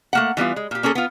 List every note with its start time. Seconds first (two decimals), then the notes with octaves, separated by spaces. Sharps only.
0.13 A3 A#3 F#5
0.37 E3 G3 B3 F4
0.56 G#3
0.71 A#2 G4
0.83 A#3 C#4 G#4 A4
0.95 B3 F4